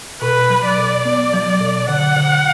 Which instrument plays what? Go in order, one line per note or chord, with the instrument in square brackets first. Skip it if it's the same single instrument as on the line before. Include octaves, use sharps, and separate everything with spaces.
[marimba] B2 [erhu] B4
[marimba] F#3
[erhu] D5
[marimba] B2
[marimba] B3 [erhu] D5
[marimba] F#3
B2
[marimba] D3 [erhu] F#5
[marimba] D3